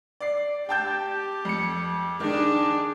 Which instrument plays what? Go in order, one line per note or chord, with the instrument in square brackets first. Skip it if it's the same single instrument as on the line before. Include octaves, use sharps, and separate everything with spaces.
[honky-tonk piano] D5 C7
[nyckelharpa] G4 [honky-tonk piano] G5 A5 G6
[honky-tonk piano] F2 C#7
[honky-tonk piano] D#3 [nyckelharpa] D4 G#4